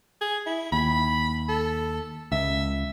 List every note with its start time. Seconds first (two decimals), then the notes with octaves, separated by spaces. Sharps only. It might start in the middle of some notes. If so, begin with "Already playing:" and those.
0.21 G#4
0.46 E4
0.72 D#2 B5
1.49 A4
2.32 C#2 E5